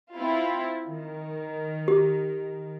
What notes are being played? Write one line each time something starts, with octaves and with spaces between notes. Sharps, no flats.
C4 E4 F4
D#3
G4